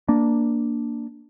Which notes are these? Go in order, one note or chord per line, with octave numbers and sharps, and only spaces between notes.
A#3 D4